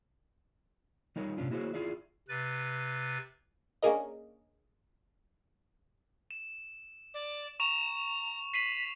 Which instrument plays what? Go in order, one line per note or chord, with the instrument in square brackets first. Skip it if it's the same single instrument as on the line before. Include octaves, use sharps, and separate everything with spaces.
[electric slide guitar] G3 D#4 A#4 C#5
G#2 C3 C#4 D4 F4
A#3 E4 F#4 G#4 C5 C#5
E4 F4 G#4 D5 E5
[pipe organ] C3 B4 A6
[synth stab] A#3 C#4 D4 G#4 A#4 D#5
[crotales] E7
[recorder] D5
[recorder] A#5 [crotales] C#6 E7 F7
[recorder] B6 [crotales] C7 D#7 F#7